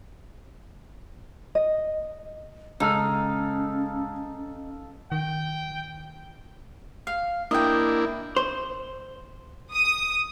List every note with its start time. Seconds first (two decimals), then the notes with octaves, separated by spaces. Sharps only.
1.55 D#5
2.80 C#3 G#3 C#4 D#4 A4 F5 F6
5.12 D#3 G5
7.07 F5
7.51 A#3 D4 E4 D#5 G5
8.37 C5
9.73 D#6